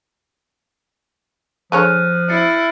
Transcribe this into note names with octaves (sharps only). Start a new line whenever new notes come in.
D3 F3 G#3 C#5 F6 F#6 D#7
E4 A6 C7 C#7